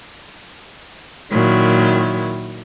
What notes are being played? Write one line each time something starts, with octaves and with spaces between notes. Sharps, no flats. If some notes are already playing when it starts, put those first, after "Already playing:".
A#2 D#3 F#3 E4